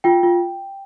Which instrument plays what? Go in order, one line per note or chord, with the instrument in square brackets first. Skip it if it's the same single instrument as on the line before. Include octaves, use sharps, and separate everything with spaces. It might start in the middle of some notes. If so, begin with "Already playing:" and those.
[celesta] F4 G5
F4